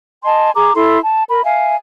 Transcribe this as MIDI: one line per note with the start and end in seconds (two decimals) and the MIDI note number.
0.23 0.50 75
0.23 0.50 80
0.23 0.50 81
0.23 0.50 84
0.55 0.73 68
0.55 0.73 82
0.55 0.73 86
0.75 0.98 64
0.75 0.98 69
0.75 0.98 84
1.02 1.23 81
1.28 1.43 70
1.28 1.43 83
1.44 1.74 76
1.44 1.74 77
1.44 1.74 80